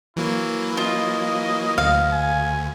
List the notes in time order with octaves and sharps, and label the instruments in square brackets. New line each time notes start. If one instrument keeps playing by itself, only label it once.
[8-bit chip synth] E3 F#3 A#3 [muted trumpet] E4
[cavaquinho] F4 [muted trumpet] D#5
[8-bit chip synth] D2 [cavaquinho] F5
[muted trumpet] G#5